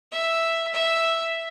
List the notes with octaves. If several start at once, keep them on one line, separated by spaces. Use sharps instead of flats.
E5
E5